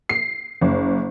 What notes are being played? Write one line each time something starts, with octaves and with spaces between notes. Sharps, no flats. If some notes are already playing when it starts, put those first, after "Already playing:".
C7
F#1